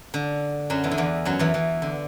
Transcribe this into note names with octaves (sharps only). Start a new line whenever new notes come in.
D3
F#2 F#3
E2 E3
D3
E2 E3
F#2 F#3
E2 E3
E2 E3
D3